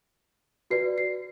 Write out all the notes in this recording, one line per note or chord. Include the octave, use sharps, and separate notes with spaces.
F#4 B4 D5 C7
C7